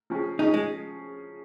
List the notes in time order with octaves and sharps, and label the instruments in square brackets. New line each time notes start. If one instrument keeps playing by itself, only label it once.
[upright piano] F3 C#4 G#4
[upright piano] F3 C#4 G#4 [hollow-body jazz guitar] D#4
[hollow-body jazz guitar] G#3